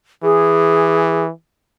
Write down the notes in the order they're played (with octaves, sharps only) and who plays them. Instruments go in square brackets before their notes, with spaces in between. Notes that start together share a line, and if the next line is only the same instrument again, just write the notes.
[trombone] E3 [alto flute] G#4